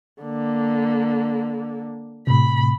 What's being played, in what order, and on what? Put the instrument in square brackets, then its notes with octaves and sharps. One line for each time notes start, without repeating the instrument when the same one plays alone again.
[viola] D3 A#3
[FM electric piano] A2 C3 [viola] B5